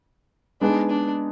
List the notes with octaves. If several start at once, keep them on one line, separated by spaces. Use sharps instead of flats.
G#3 B3 D4 D#4 G#4 B4
D4